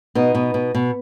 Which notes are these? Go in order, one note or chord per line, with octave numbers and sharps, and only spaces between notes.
B2 B3 D#4
B2
B2
B2